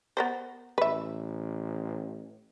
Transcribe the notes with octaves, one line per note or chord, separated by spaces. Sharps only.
B3 A#4 C5
A1 B4 E5